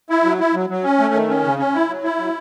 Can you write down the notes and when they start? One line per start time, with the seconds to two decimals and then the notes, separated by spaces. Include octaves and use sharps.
0.10 E4
0.24 F#3
0.39 E4
0.54 F#3
0.70 F#3
0.84 C#4
0.99 A3
1.14 D#3
1.29 C#4
1.44 C#3
1.59 C#4
1.74 E4
1.89 F#3
2.04 E4
2.19 F#3